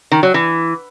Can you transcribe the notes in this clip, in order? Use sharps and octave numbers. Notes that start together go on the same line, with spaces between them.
D#3
F#3
E3